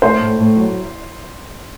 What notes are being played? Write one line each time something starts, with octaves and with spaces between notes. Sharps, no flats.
A3 C5
A2
A2
F#3